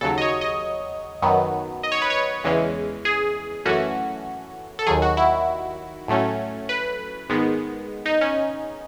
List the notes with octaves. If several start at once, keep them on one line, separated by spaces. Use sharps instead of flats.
D#2 C#3 F#3 A4
D#5
C#5
D#5
F#2 D#3 F#3 B3
D#5
C#5
B4
C#5
E2 C#3 E3 G#3 C#4
G#4
F#2 E3 A3 C#4 F#4
A4
D#2 D#3 F#3 G#4
F#4
E4
A2 F#3 A3 C#4
B4
G#2 D#3 G#3 B3
D#4
C#4